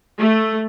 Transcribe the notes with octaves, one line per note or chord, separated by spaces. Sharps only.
A3